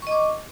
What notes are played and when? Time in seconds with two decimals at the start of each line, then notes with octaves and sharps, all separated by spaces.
0.02 C#6
0.07 D#5
0.11 D6